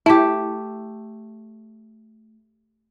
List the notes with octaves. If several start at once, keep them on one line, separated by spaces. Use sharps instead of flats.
A3 E4 G4